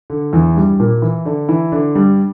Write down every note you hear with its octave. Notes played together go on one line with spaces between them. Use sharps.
D3
E2 E3
G2 G3
A#2 A#3
E3 E4
D3 D4
E3 E4
D3 D4
G2 G3